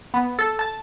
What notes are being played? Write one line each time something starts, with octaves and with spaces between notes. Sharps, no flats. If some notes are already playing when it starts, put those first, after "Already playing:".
B3
A4
A5